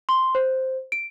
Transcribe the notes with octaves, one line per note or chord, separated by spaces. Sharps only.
C6
C5
D7